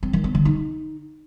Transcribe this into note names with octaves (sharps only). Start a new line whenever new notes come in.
C4
D#3
B3
D3
D#4